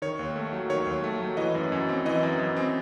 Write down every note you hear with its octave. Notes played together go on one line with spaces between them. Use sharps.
D#3 C#5
D#2
A3
F#3
D#3 C#5
D#2
A3
F#3
E3 D#5
F#2
F#2
C4
E3 D#5
F#2
F#2
C4